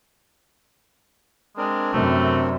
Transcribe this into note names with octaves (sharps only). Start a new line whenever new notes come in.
G#3 C4 D4 A#4
F#2 C3 A3